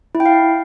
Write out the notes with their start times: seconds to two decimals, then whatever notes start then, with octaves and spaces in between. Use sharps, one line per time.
0.15 E4
0.20 G5
0.26 F5